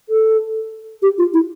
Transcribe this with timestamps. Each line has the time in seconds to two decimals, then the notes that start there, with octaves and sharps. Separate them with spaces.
0.09 A4
1.02 G4
1.18 F4
1.34 E4